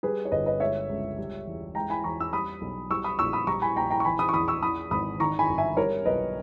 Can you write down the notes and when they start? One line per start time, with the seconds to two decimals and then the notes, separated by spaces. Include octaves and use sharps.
0.03 G3 G#4 B4
0.25 C#5
0.31 G1 B4 D#5
0.46 B4 D#5
0.60 G#3 C#5 E5
0.89 C#2
1.18 G3
1.47 E2
1.75 G#3 G5 A#5
1.90 G#5 B5
2.04 E2 A#5 C#6
2.20 E6
2.33 G3 B5 D#6
2.61 B1
2.90 G3 C#6 E6
3.04 B5 D#6
3.19 A#1 C#6 E6
3.33 B5 D#6
3.47 G3 A#5 C#6
3.62 G#5 B5
3.76 A#1 G5 A#5
3.90 G5 A#5
4.00 C#6
4.05 E3 G#5 B5
4.19 B5 D#6
4.29 C#6
4.33 E2 B5 D#6
4.48 C#6 E6
4.62 E3 B5 D#6
4.91 G#1 B5 D#6
5.20 D#3 A#5 C#6
5.39 G#5 B5
5.49 G1
5.58 E5 G#5
5.77 G3 A#4 C#5
6.06 B1 B4 D#5